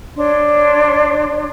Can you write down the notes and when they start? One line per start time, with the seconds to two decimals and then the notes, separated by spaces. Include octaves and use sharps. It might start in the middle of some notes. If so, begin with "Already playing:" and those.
0.16 D4 C#5 C6